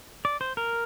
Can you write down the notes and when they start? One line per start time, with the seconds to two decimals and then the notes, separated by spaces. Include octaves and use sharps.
0.25 D5
0.41 C5
0.57 A#4